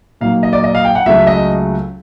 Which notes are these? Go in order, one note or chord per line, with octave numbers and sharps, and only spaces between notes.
A#2 F#3 A#3 D#4 F5
D#5
D5
D#5
F5
G5
F#5
C#2 C#3 F#3 A3 C#4 E5
D#5